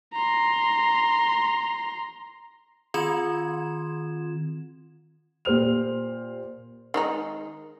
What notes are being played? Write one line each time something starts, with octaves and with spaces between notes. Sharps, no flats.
A#5 C6
D#3 C4 F4 C6 G#6 E7
A#2 G4 C5 F6 F7
D#3 G#3 D#4